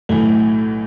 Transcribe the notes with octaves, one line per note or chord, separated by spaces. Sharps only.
B1 A2 E3 A3